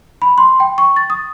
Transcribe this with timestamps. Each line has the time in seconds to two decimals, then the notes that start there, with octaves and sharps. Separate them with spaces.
0.22 B5
0.38 C6
0.60 G5
0.78 C#6
0.96 A6
1.10 D#6